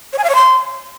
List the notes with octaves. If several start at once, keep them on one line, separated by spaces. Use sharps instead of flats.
C#5
G#5
F5
C#5
C6